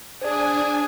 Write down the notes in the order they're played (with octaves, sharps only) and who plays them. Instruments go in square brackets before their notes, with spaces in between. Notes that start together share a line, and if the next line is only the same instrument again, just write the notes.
[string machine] D4 G#5 [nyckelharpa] G#4 [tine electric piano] C5 D5